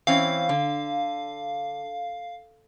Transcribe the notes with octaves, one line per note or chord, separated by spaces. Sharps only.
E3 C4 C#4 F5
D3